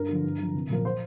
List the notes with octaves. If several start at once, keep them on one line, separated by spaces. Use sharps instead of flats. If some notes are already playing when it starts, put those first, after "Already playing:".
Already playing: G2 A#4
D3 F3
G2
D3 F3
C2
A#2 F3 A#4
C5